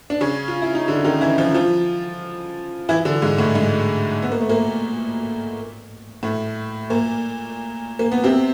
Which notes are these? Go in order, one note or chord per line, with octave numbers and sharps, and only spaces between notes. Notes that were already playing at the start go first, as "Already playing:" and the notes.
D4
C#3 C#4
F4
E4
D#4
D3 D4
D#3 D#4
E3 E4
F3 F4
F3 F4
E3 E4
D3 D4
G#2 G#3
A2 A3
G#2 G#3
B3
A#3
A3
A#2 A#3
A2 A3
A#2 A#3
A#3
B3
C3 C4